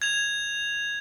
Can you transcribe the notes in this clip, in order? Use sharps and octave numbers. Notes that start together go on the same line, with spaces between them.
G#6 F7